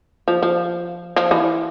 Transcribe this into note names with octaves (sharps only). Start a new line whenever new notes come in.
F3
F3
F3
E3